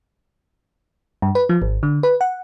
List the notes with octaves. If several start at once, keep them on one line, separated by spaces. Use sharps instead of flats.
G2
B4
F3
G#1
D3
B4
F#5